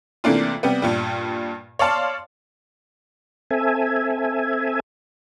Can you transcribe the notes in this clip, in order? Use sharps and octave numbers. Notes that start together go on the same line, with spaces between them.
C3 E3 A3 A#3 D4 F4
C3 G3 B3
G2 A#2 G3
C#5 D5 F5 A5 C6
C4 A4 E5 G#5